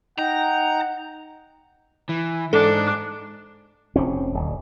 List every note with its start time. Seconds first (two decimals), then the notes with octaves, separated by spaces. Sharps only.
0.18 D#4 F#5 G5 A#5
2.09 E3
2.53 G#2 D4 A4
3.96 F1 C4 C#4
4.34 D1